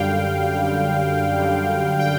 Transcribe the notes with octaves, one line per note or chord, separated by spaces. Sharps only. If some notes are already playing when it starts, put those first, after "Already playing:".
Already playing: F#2 D3 G3 F5 G5
F#2 D3 G3
F#2 D3 G3
G5